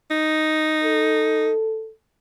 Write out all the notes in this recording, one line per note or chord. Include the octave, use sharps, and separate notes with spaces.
D#4
A4